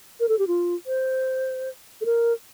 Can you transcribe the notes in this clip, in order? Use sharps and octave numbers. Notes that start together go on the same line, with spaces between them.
A#4
A4
G4
F4
C5
A4
A#4